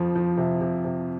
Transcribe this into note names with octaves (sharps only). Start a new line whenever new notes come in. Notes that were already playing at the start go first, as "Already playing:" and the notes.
Already playing: F2 F3
F3
C3
C3
C3